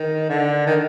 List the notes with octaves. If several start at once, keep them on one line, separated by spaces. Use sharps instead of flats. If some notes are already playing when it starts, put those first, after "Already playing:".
Already playing: D#3
D3
D#3